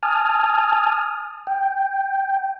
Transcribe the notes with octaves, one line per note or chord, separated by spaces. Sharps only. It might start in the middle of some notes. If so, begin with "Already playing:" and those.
G#5 A5 D#6 F6
G5